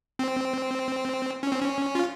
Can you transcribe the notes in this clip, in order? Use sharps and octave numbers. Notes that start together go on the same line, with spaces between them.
C4
C#4
C4
C#4
F4